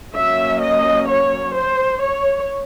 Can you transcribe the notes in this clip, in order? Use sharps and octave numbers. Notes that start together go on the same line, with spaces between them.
F#3 A#3 C#4 E5
D#5
C#5
C5
C#5